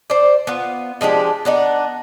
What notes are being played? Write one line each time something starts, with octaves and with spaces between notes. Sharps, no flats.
C5 D5
B3 F4
F3 G#3 D4 G4
B3 D4 D#4